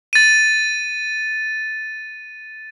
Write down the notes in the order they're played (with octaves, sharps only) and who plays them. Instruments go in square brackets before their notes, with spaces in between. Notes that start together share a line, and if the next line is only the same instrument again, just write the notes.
[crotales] A6 D#7